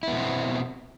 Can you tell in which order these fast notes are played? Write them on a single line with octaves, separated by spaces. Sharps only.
E4 B3 B2 C4